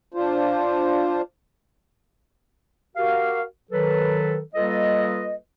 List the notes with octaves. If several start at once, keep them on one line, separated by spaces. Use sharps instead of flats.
D4 F4 C5
F#4 G4 A#4 F5
D#3 F#3 A4 B4
G3 A#3 F4 A4 B4 D#5